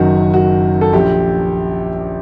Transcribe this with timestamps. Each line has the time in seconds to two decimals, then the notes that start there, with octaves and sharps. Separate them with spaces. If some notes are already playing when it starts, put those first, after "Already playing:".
Already playing: F#1 F#2 D#3 F#4
0.34 F#4
0.81 A4
0.93 A#1 A#2 G4